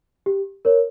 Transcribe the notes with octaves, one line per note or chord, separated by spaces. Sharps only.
G4
A#4 C#5